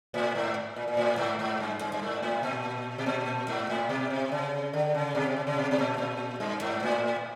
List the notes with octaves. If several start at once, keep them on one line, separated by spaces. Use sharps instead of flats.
A2
G#2
A#2
A#2
A2
G#2
G#2
G2
G2
G2
G#2
A2
A#2
B2
A#2
G#2
A2
B2
C3
C#3
D3
C#3
B2
C3
C#3
C#3
B2
B2
A#2
A#2
G2
G#2
A2